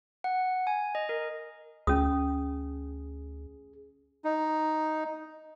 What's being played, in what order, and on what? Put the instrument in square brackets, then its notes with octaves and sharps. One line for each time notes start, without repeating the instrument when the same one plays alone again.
[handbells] F#5
G#5
D#5
A#4
[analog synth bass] D2 [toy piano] C#4 D#6 [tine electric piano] G#4
[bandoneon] D#4